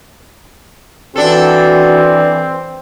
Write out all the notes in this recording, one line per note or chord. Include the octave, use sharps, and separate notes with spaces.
E3 C4 D4 F#4 A4